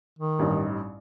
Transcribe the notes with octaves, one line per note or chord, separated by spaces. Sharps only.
D#3
A1 G2 D#4